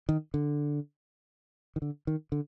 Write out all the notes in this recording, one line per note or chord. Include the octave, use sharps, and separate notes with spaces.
D#3
D3
D#3
D3
D#3
D3